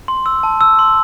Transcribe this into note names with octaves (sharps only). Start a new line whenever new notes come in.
C6
E6
A5
E6
C6